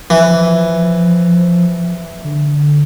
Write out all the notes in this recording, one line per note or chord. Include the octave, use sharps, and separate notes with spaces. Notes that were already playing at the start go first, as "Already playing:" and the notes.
E3 F3
D3